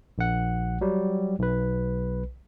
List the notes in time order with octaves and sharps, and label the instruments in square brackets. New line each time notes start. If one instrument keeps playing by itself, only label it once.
[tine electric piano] A#1 F#5
F#3 G3
B1 B4